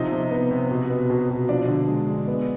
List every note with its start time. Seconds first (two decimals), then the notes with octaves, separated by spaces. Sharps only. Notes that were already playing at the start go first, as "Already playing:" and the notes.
Already playing: C3 F3 D#4 D#5
0.12 C3
0.31 B3
0.51 C3
0.71 B2
0.90 B3
1.10 B2
1.29 B2
1.49 F3 D4 D5
1.68 D3
1.88 G#3
2.08 G#3
2.28 B3